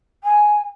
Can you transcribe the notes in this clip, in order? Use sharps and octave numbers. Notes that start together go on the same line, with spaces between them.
G#5